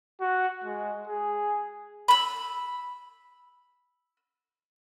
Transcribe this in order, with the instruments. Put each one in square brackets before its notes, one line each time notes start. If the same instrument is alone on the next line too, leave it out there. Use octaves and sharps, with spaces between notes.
[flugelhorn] F#4
G#3
G#4
[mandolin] B5 E6